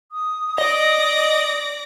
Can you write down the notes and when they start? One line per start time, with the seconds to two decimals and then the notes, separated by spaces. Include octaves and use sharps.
0.12 D#6
0.58 D5 D#5 A#6